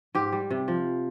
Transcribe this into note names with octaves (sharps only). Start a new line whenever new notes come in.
G#2 G4
G3
C3
F3